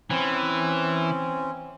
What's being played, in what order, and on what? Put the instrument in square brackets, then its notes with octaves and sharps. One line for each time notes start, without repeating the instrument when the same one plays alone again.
[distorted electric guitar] E3 [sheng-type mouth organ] C4 C#4